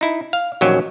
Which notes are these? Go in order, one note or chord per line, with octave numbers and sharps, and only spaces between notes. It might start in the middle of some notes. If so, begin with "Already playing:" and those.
D#4 E4
F5
A#1 D#2 F#3 C#4